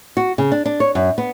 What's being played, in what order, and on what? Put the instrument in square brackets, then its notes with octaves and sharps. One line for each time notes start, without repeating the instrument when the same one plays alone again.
[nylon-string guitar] F#4
C#3
D4
D4
C#5
F#2
B3